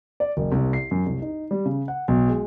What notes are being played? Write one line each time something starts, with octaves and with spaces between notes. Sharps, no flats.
D5
F#1
C2
C7
F#2
C2
D#4
G3
C#3
F#5
B1
G#3